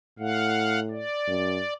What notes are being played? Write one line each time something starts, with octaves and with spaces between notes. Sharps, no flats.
A2 F5 F#5
D5
F#2